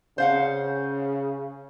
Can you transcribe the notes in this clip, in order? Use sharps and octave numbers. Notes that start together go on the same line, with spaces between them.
C#3 C5 F5 F#5